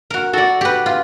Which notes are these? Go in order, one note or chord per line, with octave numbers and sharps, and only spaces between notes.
F#4 A#4
F#4 A4 D5
G4 B4
F4